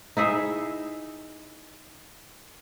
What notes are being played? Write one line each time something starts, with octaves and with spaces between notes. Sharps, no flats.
D#4 E4 G#4 E5